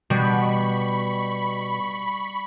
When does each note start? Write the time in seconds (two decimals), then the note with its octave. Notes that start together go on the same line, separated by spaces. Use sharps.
0.10 B2 G3 B5 C#6